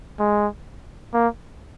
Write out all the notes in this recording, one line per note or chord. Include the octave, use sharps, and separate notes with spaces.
G#3
A#3